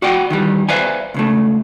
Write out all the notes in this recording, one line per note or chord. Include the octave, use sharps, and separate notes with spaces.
F#4 D5 F#5 G5
D#3 E3 G3
B4 C5 D5 E5 F5 G#5
C#2 C#3 A3